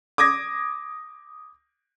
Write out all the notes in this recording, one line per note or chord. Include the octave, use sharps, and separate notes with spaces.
D6 D#6 G#6 A#6